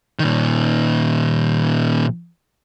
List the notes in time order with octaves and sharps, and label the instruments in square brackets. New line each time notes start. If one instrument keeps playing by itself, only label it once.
[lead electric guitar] A#2 D#3